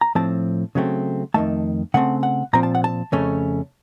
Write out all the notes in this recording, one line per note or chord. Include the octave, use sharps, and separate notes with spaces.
A#5
A2 F3 C4 A5
C#3 F#3 A3 C4
F2 D#3 A3 A5
C#3 A3 C4 F#5
F#5
A#2 F3 C4 A#5
A5
F#5
A5
F2 C#3 A3 C#4